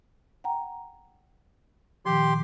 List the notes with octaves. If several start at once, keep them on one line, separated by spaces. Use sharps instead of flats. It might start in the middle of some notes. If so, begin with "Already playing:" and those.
F#5 G5 A#5
A#2 D#3 F3 G4 C6